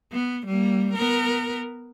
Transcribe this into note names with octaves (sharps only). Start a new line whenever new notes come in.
B3
G3 A#3
B3 A#4